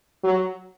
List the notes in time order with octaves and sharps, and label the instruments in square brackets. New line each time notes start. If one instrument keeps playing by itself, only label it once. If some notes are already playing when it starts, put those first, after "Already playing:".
[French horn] F#3